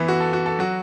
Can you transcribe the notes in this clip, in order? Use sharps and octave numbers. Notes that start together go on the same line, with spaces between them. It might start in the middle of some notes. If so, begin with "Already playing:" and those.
Already playing: E3 B3 E4
F#4
A4
F#4
A4
F#3 F#4